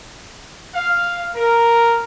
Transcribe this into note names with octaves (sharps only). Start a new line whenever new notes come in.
F5
A#4